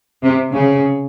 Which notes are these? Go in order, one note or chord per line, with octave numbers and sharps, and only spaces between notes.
C3
C#3